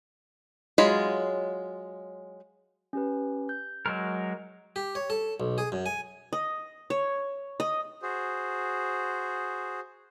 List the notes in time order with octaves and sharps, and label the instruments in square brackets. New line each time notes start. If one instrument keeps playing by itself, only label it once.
[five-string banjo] F#3 G#3 F4 B5
[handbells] C#4 G4 B4
G6
[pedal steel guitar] F#3 G#3 A#4
[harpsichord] G4
C#5
A4
B1
G#4
F#2
G#5
[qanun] D#5
C#5
D#5
[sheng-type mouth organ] F#4 G#4 C5